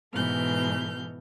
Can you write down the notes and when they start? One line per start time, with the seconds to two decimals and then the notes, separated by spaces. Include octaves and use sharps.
0.13 G#2 B2 E3 A4 F6 G6